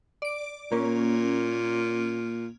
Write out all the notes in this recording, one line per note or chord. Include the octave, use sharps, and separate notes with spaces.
D5 D7
A#2 A#3 C#4